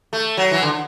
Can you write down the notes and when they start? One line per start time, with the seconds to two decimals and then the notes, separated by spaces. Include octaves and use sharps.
0.13 A3
0.37 F#3
0.51 E3
0.62 D3